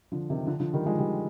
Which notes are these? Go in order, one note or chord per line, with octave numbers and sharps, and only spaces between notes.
D3 F3
C3 D#3
D3 F3
D3 F3
D#3 G3
F3 G#3
D#3 G3